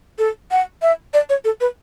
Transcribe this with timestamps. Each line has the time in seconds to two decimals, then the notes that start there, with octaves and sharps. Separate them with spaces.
0.19 A4
0.51 F#5
0.82 E5
1.14 D5
1.30 C#5
1.45 A4
1.61 B4